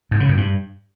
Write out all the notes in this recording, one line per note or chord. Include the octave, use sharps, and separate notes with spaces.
G#2
C#3
F#2
G2